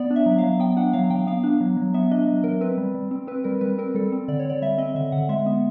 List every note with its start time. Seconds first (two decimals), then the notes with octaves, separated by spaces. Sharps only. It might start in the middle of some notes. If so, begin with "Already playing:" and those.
Already playing: B3 D5
0.10 D4
0.16 E5
0.26 F#3
0.38 F#3 F5
0.60 B3 G5
0.77 D4 F#5
0.93 F#3 F5
1.10 F#3 G5
1.27 B3 F5
1.43 D4
1.61 F#3
1.77 F#3
1.94 B3 E5
2.11 D4 D#5
2.28 F#3
2.44 F#3 A#4
2.61 C4 B4
2.77 G3
2.94 G3
3.11 C4
3.27 C4 B4
3.44 G3 A#4
3.61 G3 B4
3.78 C4 A#4
3.95 G3 A4
4.12 C4
4.28 D3 D5
4.39 C#5
4.45 D3 D5
4.62 G3 E5
4.78 C4 D#5
4.95 D3 E5
5.12 D3 F#5
5.29 G#3 E5
5.46 B3